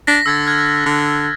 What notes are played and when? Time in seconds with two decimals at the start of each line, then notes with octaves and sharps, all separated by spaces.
0.07 D4 A#6 B6
0.26 D3 E6 G#6 A6
0.47 F6 F#6 G#6
0.86 D3